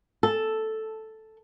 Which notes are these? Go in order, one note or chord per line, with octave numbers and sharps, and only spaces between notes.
A4